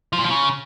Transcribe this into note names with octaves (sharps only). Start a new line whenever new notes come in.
F3
A#2
F3
C#3